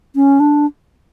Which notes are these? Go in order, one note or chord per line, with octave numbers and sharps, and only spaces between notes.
C#4
D4